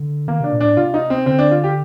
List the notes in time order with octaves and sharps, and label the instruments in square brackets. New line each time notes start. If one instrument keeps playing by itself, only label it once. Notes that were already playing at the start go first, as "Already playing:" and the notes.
Already playing: [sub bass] D3
[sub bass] D#3 [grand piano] A#3
[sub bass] C3 [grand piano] D4
[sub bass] A#2
[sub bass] A2 [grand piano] D4
[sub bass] C3 [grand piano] F4
[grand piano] D#4
C4
[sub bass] D3 [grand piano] C4
[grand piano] D4
F4
G4